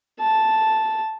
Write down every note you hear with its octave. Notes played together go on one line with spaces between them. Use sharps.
A5